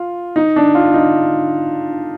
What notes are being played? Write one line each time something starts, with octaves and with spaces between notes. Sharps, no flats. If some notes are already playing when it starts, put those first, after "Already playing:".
Already playing: F4
D#4
D4
F4
D#4